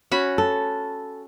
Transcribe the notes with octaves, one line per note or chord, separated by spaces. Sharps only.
C#4 F#4 B5
A4